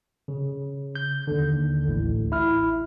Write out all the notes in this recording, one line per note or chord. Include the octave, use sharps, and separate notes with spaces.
C#3
G6
D#2 D3
A1 D2 A2
E4 F6